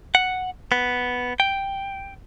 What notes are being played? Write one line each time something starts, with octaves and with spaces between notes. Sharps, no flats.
F#5
B3
G5